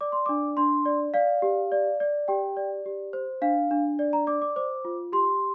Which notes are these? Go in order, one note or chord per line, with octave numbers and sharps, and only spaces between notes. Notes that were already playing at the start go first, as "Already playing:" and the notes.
D5 D6
C6
D4 D6
D4 C6
D5
D5 F5
G4
D5
D5
G4 G5
D5
G4
C5
D4 F5
D4
D5
A#5
D5 D6
D6
C5 D6
F4
G4 C6